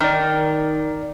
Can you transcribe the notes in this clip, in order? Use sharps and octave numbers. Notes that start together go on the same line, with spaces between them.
D#3 A#4 D5